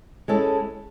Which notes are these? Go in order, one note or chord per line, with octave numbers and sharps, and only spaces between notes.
G#3 C#4 E4 A4